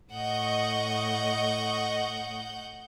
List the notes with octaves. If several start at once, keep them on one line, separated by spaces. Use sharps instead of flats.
A2 D#5 F#5 C#6 G6